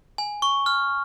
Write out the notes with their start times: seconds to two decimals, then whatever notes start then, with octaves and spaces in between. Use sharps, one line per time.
0.18 G#5
0.42 C#6
0.66 F6